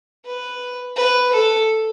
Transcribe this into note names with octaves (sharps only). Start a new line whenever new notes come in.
B4
B4
A4